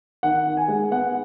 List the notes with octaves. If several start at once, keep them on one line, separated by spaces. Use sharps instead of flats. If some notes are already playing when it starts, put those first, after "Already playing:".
D#3 F#5
D#3
G#5
G#3
B3 F#5